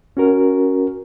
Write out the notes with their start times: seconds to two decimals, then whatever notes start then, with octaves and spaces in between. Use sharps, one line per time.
0.17 C#4 F#4 A#4